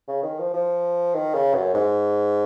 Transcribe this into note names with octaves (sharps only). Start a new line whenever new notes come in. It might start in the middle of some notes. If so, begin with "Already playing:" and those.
C#3
D#3
F3
F3
D#3
C#3
F#2
G#2